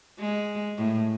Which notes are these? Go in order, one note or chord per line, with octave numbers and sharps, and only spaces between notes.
G#3
A2